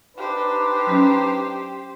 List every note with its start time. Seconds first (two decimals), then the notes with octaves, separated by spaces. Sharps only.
0.18 D4 D#4 G4 B4 C5
0.87 F#3 C#4